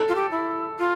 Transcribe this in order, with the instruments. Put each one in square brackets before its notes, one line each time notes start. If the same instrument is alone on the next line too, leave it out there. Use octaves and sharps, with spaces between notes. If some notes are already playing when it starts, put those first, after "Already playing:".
Already playing: [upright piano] A4
[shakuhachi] F4
G4
E4
F4